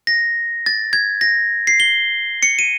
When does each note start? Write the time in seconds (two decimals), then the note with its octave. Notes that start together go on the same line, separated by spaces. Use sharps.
0.07 A#6
0.66 A6
0.93 G#6
1.21 A#6
1.67 C7
1.80 G7
2.43 C#7
2.59 D#7